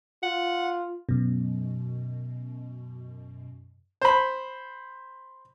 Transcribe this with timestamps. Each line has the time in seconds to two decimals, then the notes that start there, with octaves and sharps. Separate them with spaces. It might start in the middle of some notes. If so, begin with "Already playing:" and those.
0.23 F4 F#5
1.09 F#2 B2
4.01 C5 B5